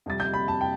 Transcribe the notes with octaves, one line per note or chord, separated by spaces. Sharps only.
F2 C3 G3 A6
G6
B5
A5
G5